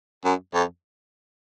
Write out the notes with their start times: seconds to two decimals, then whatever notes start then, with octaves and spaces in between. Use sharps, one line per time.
0.25 F#2
0.54 F2